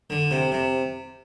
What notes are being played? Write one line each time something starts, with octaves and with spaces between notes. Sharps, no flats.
D3
C3
C3